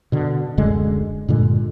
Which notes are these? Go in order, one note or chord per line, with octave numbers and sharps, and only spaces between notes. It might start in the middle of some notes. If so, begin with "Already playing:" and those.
B2 D3
D1 F#2 D3 G#3
G2 A#2 D3 G#3